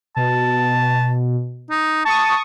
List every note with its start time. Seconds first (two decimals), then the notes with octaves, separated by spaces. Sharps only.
0.17 B2 A5
1.71 D#4
2.05 A5 C#6 D#6